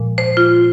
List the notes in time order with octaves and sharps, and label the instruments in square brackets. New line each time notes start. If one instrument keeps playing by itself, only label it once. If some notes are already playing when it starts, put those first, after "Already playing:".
Already playing: [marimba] A#2 F3 G#3
C5
F4